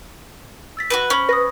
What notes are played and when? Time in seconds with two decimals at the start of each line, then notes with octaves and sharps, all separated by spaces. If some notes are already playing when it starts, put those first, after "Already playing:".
0.77 E6 A6 B6
0.90 F#4 G#4 B4
1.10 C#4 C5 B5
1.29 B4 D#6 A#6